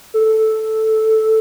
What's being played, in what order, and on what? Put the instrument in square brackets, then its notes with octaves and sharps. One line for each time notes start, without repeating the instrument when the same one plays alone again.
[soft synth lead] A4